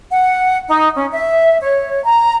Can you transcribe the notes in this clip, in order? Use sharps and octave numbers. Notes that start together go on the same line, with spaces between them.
F#5
D#4
C#4
E5
C#5
A#5